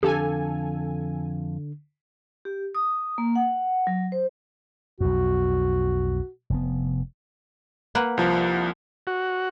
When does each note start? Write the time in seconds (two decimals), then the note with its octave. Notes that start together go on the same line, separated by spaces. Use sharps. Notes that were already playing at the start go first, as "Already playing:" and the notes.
0.03 F2 D3 G4 A4 F5 G#5
2.45 G4
2.75 D#6
3.18 A#3
3.36 F#5
3.87 F#3
4.12 C5
5.00 B1 F2 F#4
6.50 F1 B3
7.95 A#3 B4 F#5
8.17 C2 F3
9.07 F#4